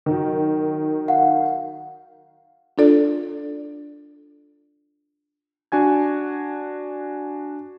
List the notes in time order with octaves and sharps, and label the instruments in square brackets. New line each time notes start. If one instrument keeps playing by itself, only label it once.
[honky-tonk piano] D#3 F#3
[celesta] F5 F#5
[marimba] D4 F4 A4 D5
[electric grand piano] D4 F#4 G#5 G#6